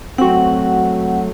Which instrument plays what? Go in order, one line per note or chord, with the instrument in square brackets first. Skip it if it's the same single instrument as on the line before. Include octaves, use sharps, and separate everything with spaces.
[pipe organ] F#3 A3 [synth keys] C4 F#4 [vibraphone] F#5